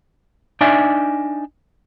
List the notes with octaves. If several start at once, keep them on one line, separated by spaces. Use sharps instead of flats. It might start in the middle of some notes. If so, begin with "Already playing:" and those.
D4 D#4 D5 E5 G#5